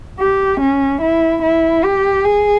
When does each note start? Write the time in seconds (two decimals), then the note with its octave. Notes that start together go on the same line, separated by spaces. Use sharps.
0.20 G4
0.61 C#4
1.02 E4
1.43 E4
1.83 G4
2.25 G#4